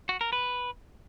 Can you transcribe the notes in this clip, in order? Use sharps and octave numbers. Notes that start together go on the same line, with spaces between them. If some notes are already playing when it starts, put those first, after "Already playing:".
F#4
A#4
B4